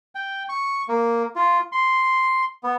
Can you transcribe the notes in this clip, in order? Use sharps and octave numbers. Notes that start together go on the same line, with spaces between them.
G5
C#6
A#3
F4
C6
B3